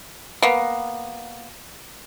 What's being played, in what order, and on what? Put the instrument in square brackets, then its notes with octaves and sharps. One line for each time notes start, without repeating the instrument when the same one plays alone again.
[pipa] A#3 B3